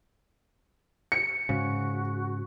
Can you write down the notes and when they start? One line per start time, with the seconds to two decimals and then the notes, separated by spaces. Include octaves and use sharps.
1.12 C#7
1.49 G#2 C#3 F#4